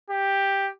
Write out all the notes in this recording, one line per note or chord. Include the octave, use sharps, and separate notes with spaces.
G4